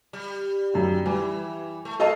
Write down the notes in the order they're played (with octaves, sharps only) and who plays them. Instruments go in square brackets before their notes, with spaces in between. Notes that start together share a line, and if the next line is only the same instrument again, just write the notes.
[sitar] G3
[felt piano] F#2 D#3
[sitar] E3 [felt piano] G3 G#5
[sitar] A3
[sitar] F4 [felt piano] A4 D#5 A5